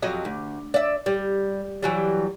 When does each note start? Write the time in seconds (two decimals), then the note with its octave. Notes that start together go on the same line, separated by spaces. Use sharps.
0.02 F2 F#3 D#5
0.25 D2
0.74 D5 E5
1.06 G3
1.82 E3 F#3 G3